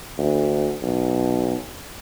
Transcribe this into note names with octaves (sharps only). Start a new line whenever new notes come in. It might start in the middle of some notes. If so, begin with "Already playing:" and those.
D2
B1